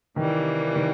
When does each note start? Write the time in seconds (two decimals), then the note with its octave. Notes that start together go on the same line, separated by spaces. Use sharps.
0.16 C3 D#3 E3 G3 A#3
0.76 D#3